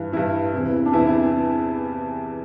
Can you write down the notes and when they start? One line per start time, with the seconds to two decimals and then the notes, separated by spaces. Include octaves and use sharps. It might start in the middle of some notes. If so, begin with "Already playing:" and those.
Already playing: G2 E3
0.12 G2 E3 E4
0.53 E2 C3 E3
0.85 D4
0.93 E2 C3 E3 E4
1.07 E4